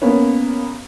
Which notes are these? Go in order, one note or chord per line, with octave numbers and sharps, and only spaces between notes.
A#3 B3 C#4